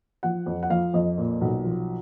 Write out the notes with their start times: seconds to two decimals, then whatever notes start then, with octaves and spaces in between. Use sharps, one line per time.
0.23 F3 F#5
0.46 F2
0.63 F#5
0.70 F3 F5
0.94 F2 D#5
1.18 A#2
1.41 B1
1.65 F3